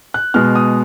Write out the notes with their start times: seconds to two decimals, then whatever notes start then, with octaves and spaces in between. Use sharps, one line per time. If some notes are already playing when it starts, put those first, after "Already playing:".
0.14 F#6
0.34 B2 G#3 F6
0.55 D#6